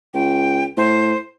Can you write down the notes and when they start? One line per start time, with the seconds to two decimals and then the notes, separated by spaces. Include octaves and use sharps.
0.14 C#2 G5
0.77 A2 C5